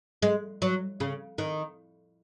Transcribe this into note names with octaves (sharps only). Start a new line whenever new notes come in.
G#3
F#3
C#3
D#3